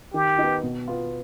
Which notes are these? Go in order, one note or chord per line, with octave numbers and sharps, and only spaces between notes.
D#3 G4
B3 D#4
B2
B3 F4